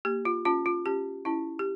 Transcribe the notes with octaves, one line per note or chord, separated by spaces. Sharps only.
A#3 G4
F4
C#4 F4
F4
C#4 G4
C#4 E4
G4